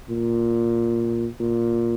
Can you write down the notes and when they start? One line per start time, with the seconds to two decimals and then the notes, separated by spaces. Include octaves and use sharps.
0.10 A#2
1.40 A#2